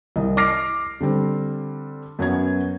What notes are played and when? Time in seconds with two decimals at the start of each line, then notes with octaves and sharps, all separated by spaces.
0.16 C2 D#5
0.37 D6 F6 A#6 C7
1.01 D3 G3 C4
2.19 F#2 F#3 B3 G#6